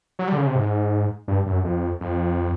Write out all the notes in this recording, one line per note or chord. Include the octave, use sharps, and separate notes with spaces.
F#3
G3
D3
C#3
C3
G#2
G2
F#2
F2
F2